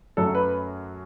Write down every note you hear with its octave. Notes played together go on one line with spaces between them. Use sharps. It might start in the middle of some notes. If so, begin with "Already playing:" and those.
F#2 F#3 A3 A4
B4